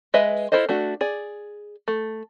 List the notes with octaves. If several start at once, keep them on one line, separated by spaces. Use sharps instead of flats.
G#3 B4 D#5 E5
E4 F4 A4 C5 D#5
A3 D4 F#4
G#4 D5
A3